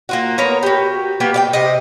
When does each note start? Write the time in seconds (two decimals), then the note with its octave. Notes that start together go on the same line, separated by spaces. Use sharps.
0.09 A#3 F4 F#4
0.38 B3 A#4 C#5 A#5
0.63 F#4 G4
1.20 A#3 B3 G4
1.34 D5 F5 G5
1.53 C3 D#5